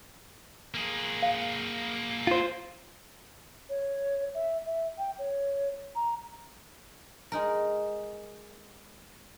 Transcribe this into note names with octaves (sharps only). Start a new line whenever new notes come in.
A#3 G#4
F5
F4 C5
C#5
E5
E5
G5
C#5
A#5
G#3 D#4 A#4